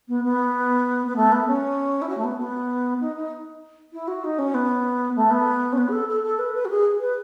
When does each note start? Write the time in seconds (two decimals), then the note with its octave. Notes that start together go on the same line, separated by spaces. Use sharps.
0.08 B3
0.24 B3
1.07 B3
1.16 A3
1.32 B3
1.47 C#4
2.02 E4
2.09 F#4
2.17 A3
2.24 B3
2.39 B3
3.00 D#4
3.16 D#4
3.93 E4
4.08 F#4
4.24 D#4
4.38 C#4
4.54 B3
5.16 A3
5.31 B3
5.72 C#4
5.77 B3
5.88 G#4
5.92 A4
6.09 A4
6.23 A4
6.39 B4
6.54 B4
6.65 F#4
6.70 G#4
7.00 B4